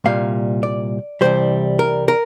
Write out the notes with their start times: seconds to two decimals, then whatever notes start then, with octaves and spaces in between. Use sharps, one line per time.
0.04 C2 A#2 G3 F5
0.63 D5
1.21 C2 C3 E3 G3 C5
1.79 A#4
2.08 A#4